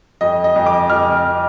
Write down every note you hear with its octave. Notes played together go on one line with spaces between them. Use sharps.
F2 D#5
D#5
F2
D6
F2 F6